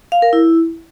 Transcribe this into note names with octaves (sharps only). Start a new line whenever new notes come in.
F5
A#4
E4